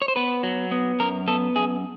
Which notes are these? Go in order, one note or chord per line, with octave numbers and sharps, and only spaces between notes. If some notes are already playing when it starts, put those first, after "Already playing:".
C#5
C5
B3 B4
F#3
B3
F#2 A#4
B3 A4
F#2 G#4